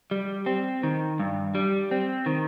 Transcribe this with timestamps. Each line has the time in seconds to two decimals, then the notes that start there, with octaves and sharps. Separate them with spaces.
0.11 G3
0.46 C4
0.83 D#3
1.19 G2
1.55 G3
1.91 C4
2.26 D#3